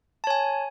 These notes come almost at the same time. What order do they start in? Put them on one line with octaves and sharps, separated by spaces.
A5 C#5 G#5